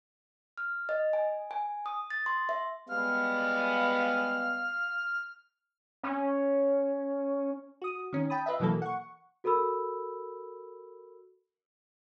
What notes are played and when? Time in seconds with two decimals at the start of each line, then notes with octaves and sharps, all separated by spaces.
0.58 F6
0.89 D#5
1.13 G#5
1.51 G#5
1.86 D#6
2.10 A6
2.26 C6
2.49 E5
2.89 G3 G#3 B3 F5 F6
6.03 C#4
7.82 F#4 D#6
8.13 D#3 C#4
8.30 G5 A5 B5 D#6
8.46 F4 B4 D#5 E5
8.60 B2 E3 F#3 A#3 A4
8.82 F#5 C#6
9.44 F#4 A4 A#4 B5 E6